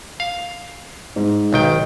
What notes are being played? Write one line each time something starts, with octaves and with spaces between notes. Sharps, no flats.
F5
G#2
B1 D#3 G5